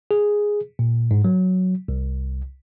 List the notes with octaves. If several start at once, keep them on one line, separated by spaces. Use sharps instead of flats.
G#4
A#2
G#2
F#3
C2